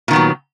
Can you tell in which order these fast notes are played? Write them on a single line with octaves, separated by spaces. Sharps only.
A#2 D#3 B3 F#3